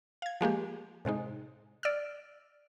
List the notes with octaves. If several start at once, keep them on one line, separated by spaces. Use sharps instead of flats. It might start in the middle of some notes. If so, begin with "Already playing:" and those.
F5 G#6
F3 G#3 A#3 G4
A2 C3 G#3 D#4
D5 E6 F6